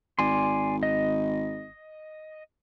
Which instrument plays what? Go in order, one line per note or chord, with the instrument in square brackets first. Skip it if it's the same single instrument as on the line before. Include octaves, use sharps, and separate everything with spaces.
[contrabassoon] G#1 [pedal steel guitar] D5 G#5 C6
[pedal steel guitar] D#5